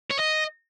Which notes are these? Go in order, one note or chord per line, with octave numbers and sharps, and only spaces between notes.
C#5
D#5